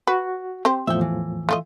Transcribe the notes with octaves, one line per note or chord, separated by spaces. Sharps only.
F#4 B4
C4 G4 C5
E2 A2 F3 E5 G5
E3
A3 F4 D#5